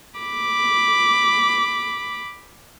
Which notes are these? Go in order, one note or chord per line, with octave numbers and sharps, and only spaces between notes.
B5 D6